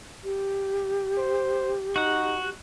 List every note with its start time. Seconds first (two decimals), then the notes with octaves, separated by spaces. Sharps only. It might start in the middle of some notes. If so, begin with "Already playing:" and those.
0.24 G4
1.17 C5
1.96 D#4 F#4 F#5